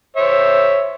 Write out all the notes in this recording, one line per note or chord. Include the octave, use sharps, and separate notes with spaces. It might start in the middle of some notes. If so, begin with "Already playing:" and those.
C5 C#5 E5